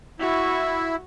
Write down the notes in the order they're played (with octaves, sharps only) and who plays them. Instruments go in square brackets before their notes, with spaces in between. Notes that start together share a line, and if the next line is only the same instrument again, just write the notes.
[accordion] E4 [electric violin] F#4 C#6